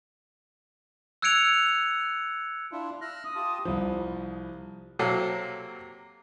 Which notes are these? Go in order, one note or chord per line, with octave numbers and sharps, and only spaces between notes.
E6 F#6 G#6 C#7 D7 F7
D4 E4 F4
E5 F6 F#6 A#6
D#6
F4 G4 A5
C2 F3
C3 F#3 A#3 A4